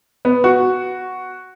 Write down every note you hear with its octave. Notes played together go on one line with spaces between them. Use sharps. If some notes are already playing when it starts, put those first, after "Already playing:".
B3
F#4